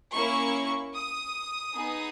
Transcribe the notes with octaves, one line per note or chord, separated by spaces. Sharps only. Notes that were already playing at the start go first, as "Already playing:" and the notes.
A#3 C#4 E4 C#6
D#6
B3 D#4 G#4